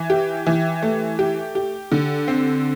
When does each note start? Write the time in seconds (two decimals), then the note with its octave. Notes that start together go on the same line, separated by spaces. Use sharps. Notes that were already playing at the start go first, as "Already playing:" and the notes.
Already playing: E3
0.10 G4
0.47 E3
0.83 A3
1.19 G4
1.55 G4
1.92 D3
2.28 C4